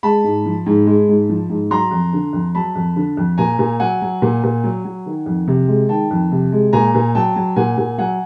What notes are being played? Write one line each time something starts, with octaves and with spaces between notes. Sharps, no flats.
G#3 A5 B5
G#2
F3
G#2
G#3
G#2
F3
G#2
F#3 A#5 C6
F2
D3
F2
F#3 A5 B5
F2
D3
F2
A#2 G#5 A#5
A#2
F#3 F#5 G#5
F#3
A#2
A#2
F#3
F#3
D#3
F2
C3
G#3
D#3 G5 A5
F2
C3
G#3
A#2 G#5 A#5
A#2
F#3 G5 A5
F#3
A#2 F#5 G#5
A#2
F#3 F#5 G#5